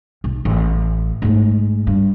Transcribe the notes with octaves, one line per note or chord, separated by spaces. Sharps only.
B1
A1
G#2 A3
G2